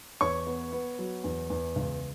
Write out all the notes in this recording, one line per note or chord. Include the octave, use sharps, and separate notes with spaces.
E2 C#5 C#6
B3
B3
F#3
E2
E2
C#2